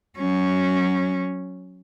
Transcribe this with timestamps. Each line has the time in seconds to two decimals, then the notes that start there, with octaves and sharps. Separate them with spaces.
0.17 F#3 C#4